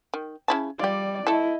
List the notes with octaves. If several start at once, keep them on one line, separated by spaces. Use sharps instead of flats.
D#3
C#3 E4 A5
G3 F4 G4 D5
A3 E4 A4 D#5 A5